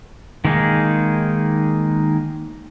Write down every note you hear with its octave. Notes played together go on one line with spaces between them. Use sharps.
D#3 G#3 A#3 D#4 G#4